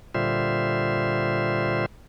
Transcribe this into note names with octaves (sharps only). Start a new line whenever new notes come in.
A#2 D3 G3 F4 C5 E5